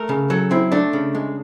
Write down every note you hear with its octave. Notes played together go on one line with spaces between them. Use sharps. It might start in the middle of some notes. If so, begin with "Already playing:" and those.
Already playing: A3 A#4
C#3
F#3 A4
C4 E4
A3 D4
C#3
G#3